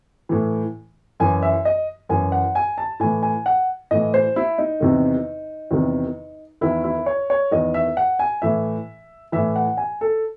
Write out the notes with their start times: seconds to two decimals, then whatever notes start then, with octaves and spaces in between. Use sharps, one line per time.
0.29 A2 E3
1.20 F#2 E3 G#5
1.43 E5
1.65 D#5
2.09 F#2 E3 G#5
2.32 F#5
2.55 G#5
2.78 A5
3.00 A2 E3 G#5
3.23 G#5
3.46 F#5
3.91 A2 E3 D#5
4.14 C5
4.36 E4
4.58 D#4
4.80 E2 C3 D#3
5.71 E2 C3 D#3
6.61 E2 D#3 E4
6.84 E4
7.06 C#5
7.30 C#5
7.51 E2 D#3 D#5
7.74 E5
7.97 F#5
8.19 G#5
8.42 A2 E3 E5
9.32 A2 E3 E5
9.56 F#5
9.77 G#5
10.01 A4